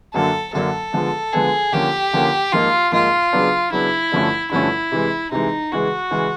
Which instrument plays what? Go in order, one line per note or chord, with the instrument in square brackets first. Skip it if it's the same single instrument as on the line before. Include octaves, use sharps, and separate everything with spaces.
[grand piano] F#2 D3 F#3 A#3 D4 [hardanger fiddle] A4
[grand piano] F#2 D3 F#3 A#3 D4 [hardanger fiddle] A4
[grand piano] D3 F3 G#3 B3
[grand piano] D3 F3 G#3 B3 [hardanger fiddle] G#4
[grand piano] D3 F3 A#3 C#4 [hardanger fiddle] G4
[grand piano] D3 F3 A#3 C#4
[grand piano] G#2 F3 A#3 D#4 [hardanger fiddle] F4
[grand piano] G#2 F3 A#3 D#4 [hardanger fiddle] F4
[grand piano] C#3 F#3 B3 D4
[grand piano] C#3 F#3 B3 D4 [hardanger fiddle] E4
[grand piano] G2 D3 F3 A3 C#4
[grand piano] G2 D3 F3 A3 C#4 [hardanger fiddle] E4
[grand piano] C3 E3 G#3
[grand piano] C3 E3 G#3 [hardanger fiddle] D#4
[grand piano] C#3 E3 G#3 [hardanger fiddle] F#4
[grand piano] C#3 E3 G#3